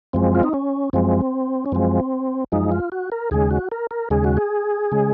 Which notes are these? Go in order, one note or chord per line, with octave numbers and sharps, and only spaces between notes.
F#2 F3 G#3 C4
F4
D#4
C#4
F#2 F3 G#3 C4
C#4
F#2 F3 G#3 C4
F#2 F3 G#3 D#4
F4
F#4
A#4
D#2 C#3 G#3 G#4
F#4
A#4
A#4
D#2 C#3 G#3 G#4
F#4
G#4
C#3 G#3